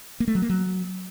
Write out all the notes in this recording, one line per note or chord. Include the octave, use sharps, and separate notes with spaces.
A#3
A3
F#3
A#3
F#3